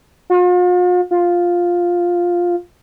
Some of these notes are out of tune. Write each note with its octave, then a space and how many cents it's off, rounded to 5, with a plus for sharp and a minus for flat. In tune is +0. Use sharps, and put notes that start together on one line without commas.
F4 +45
F4 +5